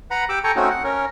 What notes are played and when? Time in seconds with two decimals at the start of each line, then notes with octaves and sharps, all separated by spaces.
0.11 B4 F#5 A#5 B5
0.29 G4 D6 E6
0.44 A4 G5 G#5 A#5 C#6
0.56 A3 C4 C#4 D#4 F#4
0.70 F#5
0.84 C#4 A#4